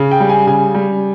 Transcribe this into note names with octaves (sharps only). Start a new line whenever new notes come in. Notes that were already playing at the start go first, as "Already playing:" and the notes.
Already playing: C#3
G5
G3
G#5
C#3 G#5
G3